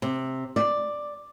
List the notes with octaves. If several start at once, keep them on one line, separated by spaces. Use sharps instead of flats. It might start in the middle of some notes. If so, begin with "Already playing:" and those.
C3
D5